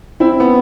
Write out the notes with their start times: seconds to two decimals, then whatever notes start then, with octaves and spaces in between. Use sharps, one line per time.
0.20 C4 E4
0.40 B3